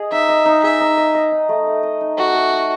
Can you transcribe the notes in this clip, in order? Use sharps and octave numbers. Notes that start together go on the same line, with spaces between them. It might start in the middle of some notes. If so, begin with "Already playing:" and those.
Already playing: G#4 D#5
D#4 E5
D#5
D#4
G#4 E5
D#4
D#5
D#5
D#4
A3
A4
D#5
D#4
A3 F#4
A4
D#5